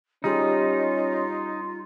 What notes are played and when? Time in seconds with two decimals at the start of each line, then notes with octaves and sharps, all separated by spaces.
0.24 G3 C#4 D#4 F4 G#4